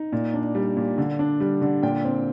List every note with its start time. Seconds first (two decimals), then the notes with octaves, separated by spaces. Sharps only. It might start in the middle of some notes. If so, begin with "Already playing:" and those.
Already playing: D#4
0.12 A#2
0.34 D4
0.55 G3
0.77 A#2
0.98 D3
1.19 D4
1.40 G3
1.61 D3
1.82 A#2 G5
2.04 C4